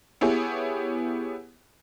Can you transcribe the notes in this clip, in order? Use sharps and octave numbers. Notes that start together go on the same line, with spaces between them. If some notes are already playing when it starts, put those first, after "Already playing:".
B3 E4 G4 G#4 C#5